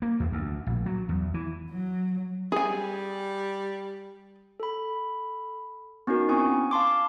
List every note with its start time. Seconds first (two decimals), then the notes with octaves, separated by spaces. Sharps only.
0.02 A#3
0.20 E2
0.32 D2
0.67 A#1
0.86 F#3
1.09 E2
1.34 E3
1.70 F#3
2.52 G3 G#4 G#5
4.60 A4 B5
6.07 B3 C#4 D#4 F#4 A#4
6.28 C4 E4 G#5 C#6 D#6
6.71 F5 A5 C6 D6